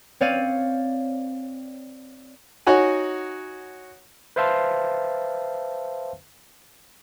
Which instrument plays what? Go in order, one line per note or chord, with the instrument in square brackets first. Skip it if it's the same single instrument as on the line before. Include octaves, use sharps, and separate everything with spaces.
[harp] C4 C#5 D5 F5 D#7
[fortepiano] D#4 F#4 C#5 F#5 G#5
[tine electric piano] B4 C5 E5 F5 A5 C6